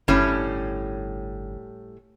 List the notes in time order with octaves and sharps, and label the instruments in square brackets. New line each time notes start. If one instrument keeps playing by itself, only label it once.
[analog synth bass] G1 [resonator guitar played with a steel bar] A2 G3 C#4